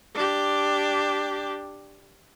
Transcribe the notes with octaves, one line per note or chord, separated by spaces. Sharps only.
D4 G4